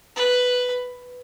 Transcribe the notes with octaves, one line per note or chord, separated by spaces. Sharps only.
B4